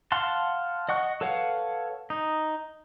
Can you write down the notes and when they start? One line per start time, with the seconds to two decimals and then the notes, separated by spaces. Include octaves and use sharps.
0.12 F5 F#5 A5 C6
0.89 D#5 F#5 C#6 F#6
1.21 A4 B4 C#5 F5 F#5
2.10 D#4